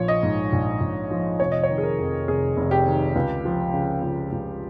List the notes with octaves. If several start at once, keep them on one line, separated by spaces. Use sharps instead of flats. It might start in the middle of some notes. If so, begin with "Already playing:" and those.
Already playing: A#1 F3 C#5
D#5
G#2
A#1
A#1
F3
F1 C#5
D#5
D#3 C#5
G#4
A#4
F2
F1 G#4
F1
G4
D#3
C#2
F3
C#3
C#2
C#2